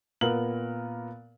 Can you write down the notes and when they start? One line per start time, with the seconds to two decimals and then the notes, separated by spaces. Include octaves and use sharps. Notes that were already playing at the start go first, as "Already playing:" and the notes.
0.21 A#2 B3 A#4 F#7